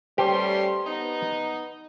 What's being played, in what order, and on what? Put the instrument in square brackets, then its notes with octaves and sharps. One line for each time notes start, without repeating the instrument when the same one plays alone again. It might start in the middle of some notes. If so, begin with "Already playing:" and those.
[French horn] G3 [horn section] A3 C#4 C6 [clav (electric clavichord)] G4 [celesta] B4 C5 A5
[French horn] B3 [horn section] D#4